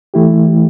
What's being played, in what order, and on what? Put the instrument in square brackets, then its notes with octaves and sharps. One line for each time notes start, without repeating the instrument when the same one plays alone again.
[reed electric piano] E3 A3 E4 G4